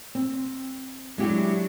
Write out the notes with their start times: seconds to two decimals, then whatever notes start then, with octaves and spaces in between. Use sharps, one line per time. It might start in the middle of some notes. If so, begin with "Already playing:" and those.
0.15 C4
1.18 F#3 G#3 D4 E4 G4